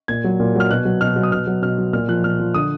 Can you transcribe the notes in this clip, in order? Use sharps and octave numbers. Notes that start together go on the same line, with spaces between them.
A#2 G#6
F#3
A#2
F#3 F6
B2 F#6
F#3
B2 F6
F#3
D#6
B2 F6
F#3
B2 F6
F#3
A#2 F6
F3 F#6
A#2 F6
F3
D3 D#6